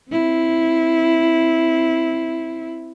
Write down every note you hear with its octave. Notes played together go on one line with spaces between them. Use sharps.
C4 E4